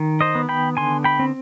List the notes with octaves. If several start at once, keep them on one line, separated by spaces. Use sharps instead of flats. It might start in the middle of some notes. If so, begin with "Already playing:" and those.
Already playing: D#3
C5 D#5
B3
G5 B5
D3 G#5 C6
G5 B5
C4